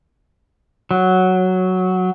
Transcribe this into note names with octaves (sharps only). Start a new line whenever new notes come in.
F#3